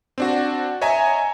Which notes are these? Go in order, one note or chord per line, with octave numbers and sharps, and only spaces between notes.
C4 D4 F#4
C#5 D#5 E5 G#5 A#5